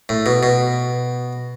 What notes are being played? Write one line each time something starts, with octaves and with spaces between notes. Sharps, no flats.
A2
B2
B2